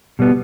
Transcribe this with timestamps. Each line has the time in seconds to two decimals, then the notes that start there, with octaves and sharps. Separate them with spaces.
0.19 B2 G3 B3